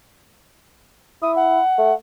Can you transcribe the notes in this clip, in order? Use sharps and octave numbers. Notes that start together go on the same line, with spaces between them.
E4 D#6
F#5
A3